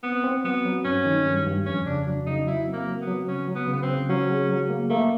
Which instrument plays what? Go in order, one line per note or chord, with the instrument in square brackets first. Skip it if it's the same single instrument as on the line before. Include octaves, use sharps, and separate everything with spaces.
[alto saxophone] B3 [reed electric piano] C4
[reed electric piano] C4
[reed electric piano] F#3 [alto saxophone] B3
[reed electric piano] F#3
[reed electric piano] G2 [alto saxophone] C#4
[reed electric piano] D#3
G2
G2
[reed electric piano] F2 [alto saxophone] C#4
[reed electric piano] C#3 [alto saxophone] D4
[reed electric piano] F#3 [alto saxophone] D4
[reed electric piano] C#3 [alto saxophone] D#4
[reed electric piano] F#3 [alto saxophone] E4
[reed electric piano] C4
[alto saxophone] A#3
[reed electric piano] F#3
[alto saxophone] B3
[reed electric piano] F#3
[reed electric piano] C#3 [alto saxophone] C#4
[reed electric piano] F#3
[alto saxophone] B3
[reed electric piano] C#3
[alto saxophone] B3
C4
[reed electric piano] C#3
[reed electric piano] F#3 [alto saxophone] C#4
[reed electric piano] G#4
F#3
A#3
[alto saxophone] A3 [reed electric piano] A#3